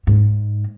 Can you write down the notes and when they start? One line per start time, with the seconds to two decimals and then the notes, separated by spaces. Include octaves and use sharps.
0.07 G#2